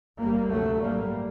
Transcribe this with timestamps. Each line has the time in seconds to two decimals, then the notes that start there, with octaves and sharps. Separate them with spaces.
0.18 G1 G2 G3 A#3
0.48 D2 C3 F#3 A3
0.79 A1 G2 G3 A#3